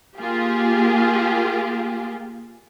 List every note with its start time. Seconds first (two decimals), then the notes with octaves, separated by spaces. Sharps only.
0.19 A#3 F4 G4 G#4